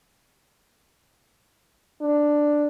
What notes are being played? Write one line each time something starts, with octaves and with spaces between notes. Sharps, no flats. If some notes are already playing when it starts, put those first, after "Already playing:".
D4